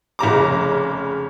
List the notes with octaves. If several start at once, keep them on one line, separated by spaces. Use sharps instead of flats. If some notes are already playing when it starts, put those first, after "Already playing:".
F1 C#3 A#5 D6